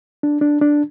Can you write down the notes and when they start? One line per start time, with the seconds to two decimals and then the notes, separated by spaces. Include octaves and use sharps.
0.23 D4
0.41 D4
0.61 D4